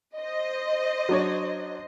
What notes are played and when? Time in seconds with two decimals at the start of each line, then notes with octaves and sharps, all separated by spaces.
0.18 C5 D#5
1.09 F#3 D4 C#5